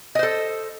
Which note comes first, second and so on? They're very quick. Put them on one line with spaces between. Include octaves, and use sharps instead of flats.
D#5 C5 A4